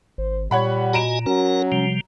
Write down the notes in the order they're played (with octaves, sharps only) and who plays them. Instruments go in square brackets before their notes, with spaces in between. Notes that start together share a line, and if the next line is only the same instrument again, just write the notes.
[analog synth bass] G#1 [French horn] C5
[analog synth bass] A#2 [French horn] G3 [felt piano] C#5 F#5 B5
[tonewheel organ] F#4 D#5 G#5 [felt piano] A#5 D7 E7
[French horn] F#3 [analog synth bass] C#4 [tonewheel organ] F#4 A#4
[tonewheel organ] C3 F3 G3